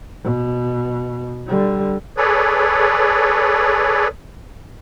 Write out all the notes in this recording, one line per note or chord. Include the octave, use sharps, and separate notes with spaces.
B2
D3 G3
G#4 A4 B4 C#5 D5